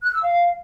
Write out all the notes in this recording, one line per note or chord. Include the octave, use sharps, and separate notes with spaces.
F#6
E6
F5